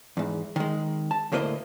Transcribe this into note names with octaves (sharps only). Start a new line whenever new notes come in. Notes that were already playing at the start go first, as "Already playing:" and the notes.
E2 G#2
D#3 G#3
A5
D2 A2 A#3 C5 D#5